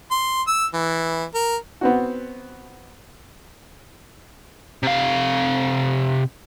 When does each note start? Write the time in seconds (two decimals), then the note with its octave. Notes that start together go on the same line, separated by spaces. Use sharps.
0.11 C6
0.47 E6
0.74 E3
1.34 A#4
1.81 B3 C4 F#4
4.83 C3 F5